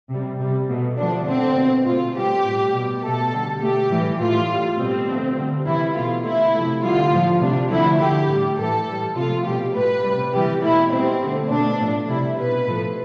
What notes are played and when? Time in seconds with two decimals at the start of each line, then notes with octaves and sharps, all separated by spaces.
0.10 C3 G3
0.40 C3 G3
0.69 B2 A3
0.98 D3 F3 A3 D4
1.27 D3 A3 C4
1.56 B2 A3
1.85 B2 A3 F4
2.15 B2 G3 G4
2.44 A2 G3
2.73 B2 G3
3.03 B2 A3 A4
3.33 D3 G3
3.61 B2 A3 G4
3.90 A2 E3 G3
4.19 A2 E3 A3 F4
4.49 A2 G3
4.78 B2 G3 C4
5.08 D3 F3 A3
5.37 D3 G3
5.66 C3 E3 G3 E4
5.94 B2 A3 F4
6.24 D3 A3 E4
6.53 C3 F3 A3
6.82 D3 G3 F4
7.12 A2 F3 A3
7.41 C3 G3 D4
7.70 D3 F3 A3 E4
7.99 D3 A3 G4
8.28 A2 G3
8.59 A2 E3 A3 A4
8.87 A2 G3
9.16 C3 F3 A3 F4
9.46 B2 G3 G4
9.74 A2 G3 B4
10.04 C3 G3
10.33 C3 E3 G3 G4
10.63 B2 A3 E4
10.92 B2 G3 C4
11.21 D3 A3
11.50 B2 A3 D4
11.79 A2 F3 A3
12.09 C3 G3 E4
12.37 B2 G3 B4
12.67 A2 F3 A3